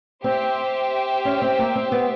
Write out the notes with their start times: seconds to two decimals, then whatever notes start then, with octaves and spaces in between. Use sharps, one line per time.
0.24 C4 G4 C5 E5 G5
1.25 C#4
1.42 C4
1.59 A#3
1.76 C4
1.92 B3